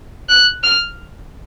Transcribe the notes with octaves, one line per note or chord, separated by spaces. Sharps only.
F#6
F6